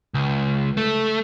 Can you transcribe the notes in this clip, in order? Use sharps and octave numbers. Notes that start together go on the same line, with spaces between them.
C#2
A3